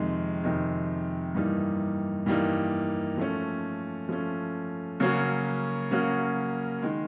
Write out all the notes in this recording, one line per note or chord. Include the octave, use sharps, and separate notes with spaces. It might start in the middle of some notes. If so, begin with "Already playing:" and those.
Already playing: F2 C3 D#3 G#3
F2 C3 D#3 G#3
G2 E3 G3 A#3 D#4
G2 E3 G3 A#3 D#4
F3 A3 C#4
F3 A3 C#4
C#3 F#3 A#3 C#4 F#4
C#3 F#3 A#3 C#4 F#4
D#3 G#3